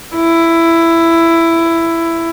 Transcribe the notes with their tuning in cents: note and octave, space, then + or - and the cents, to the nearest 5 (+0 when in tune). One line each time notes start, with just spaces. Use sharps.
E4 +10